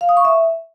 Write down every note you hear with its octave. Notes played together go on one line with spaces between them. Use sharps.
F5
D#6
C#6
E5